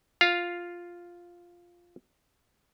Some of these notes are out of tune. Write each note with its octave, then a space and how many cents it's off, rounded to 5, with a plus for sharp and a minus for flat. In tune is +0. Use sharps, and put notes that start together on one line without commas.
F4 +0 F5 +0